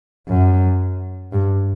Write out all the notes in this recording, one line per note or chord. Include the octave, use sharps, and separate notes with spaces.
F#2
G2